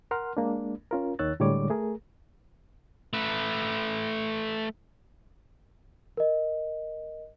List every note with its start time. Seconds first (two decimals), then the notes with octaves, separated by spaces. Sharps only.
0.11 A#4 F#5 C6 F6
0.37 G#3 A#3 D4
0.91 C#4 F4 A#4
1.19 D#2 D#3 C#5 E6 F#6 A6
1.40 A2 D3 G3 G#3 C#5 D6
1.70 A3 G#4 A#4
3.13 A3 B4
6.17 A#4 D#5